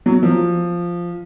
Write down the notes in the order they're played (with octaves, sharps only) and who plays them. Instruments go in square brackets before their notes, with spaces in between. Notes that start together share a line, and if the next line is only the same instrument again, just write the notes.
[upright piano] F#3
F3